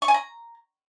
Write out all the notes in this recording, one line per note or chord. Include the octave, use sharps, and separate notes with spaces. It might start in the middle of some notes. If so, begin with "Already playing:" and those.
C#6
G#5
A#5